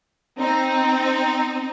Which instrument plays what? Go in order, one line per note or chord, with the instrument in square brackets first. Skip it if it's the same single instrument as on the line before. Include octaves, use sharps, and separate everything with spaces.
[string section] C4 D#4